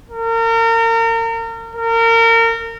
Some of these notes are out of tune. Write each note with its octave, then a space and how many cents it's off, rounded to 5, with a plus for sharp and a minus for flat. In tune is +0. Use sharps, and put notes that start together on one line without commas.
A#4 -35
A#4 -30